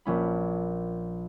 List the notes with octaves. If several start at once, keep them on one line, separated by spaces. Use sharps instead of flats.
A#1 C#4 B5